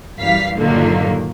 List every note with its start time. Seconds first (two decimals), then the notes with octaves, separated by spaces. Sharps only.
0.18 F#2 E3 G3 F5 B6
0.58 G2 A#2 D3 D#3 F#3 A#3